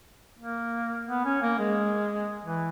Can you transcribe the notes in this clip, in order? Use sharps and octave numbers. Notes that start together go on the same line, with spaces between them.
A#3
B3
C#4
A#3
G#3
E3